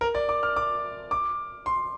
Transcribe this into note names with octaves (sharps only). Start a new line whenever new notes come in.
A#4
D5
D6
F6
D6
D6
C6